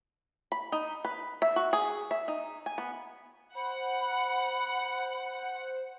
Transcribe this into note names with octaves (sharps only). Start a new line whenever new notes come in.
B5
D#4
B4
E5
F#4
G#4
E5
D#4
G#5
B3
C5 F#5 B5